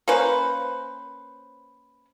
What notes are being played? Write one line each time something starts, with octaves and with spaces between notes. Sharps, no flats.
A#3 C#4 B4 C5